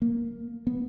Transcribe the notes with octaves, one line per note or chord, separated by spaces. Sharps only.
A#3
B3